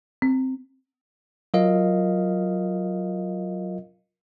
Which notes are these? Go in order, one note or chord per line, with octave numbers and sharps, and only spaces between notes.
C4
F#3 F4 A#4 D#5 F5